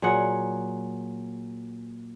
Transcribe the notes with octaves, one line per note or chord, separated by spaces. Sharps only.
A#2 F#3 G#4 F#5